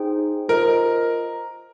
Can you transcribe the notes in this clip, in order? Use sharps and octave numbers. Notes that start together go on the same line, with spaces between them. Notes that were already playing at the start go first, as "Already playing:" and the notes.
Already playing: D#4 G#4 C5 G5
F4 A#4 C5 D#5